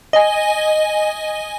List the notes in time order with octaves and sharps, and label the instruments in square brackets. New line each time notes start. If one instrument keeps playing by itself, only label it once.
[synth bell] D#5 G#5